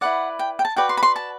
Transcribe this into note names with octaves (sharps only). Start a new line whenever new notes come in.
E4 B4 D5 F#5
G5
G5
A5
F#4 B4 D5 G5
C6
B5
C6
A5